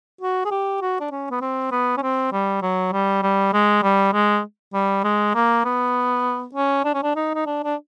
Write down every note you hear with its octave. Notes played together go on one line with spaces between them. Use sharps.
F#4
G#4
G4
F#4
D4
C#4
B3
C4
B3
C#4
C4
G3
F#3
G3
G3
G#3
G3
G#3
G3
G#3
A#3
B3
C#4
D4
C#4
D4
D#4
D#4
D4
D4